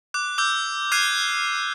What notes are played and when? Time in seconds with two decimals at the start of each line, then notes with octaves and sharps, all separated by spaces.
0.14 D6 F#6
0.38 D6 E6 G6
0.92 D6 F6 F#6 G#6 C7 D#7